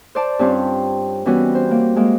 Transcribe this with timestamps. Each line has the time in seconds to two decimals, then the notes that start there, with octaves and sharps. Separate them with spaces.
0.15 C5 D5 A5
0.39 G2 G3 C4 C#4 F4
1.26 E3 G3 B3 C#4 F#4
1.55 C5
1.71 A#3
1.96 G#3 A#3